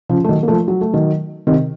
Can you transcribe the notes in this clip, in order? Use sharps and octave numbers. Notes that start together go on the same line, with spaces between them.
C#3 F3
A3
D#3 F#3
A#3
F3 A3
F#3
A3
D#3 F#3
C3 D#3